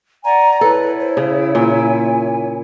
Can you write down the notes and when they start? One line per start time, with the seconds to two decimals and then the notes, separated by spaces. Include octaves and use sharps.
0.25 D5 F#5 G#5 A#5
0.61 E4 A4 B4 C#5
1.00 C5
1.17 C#3
1.55 A#2 G#5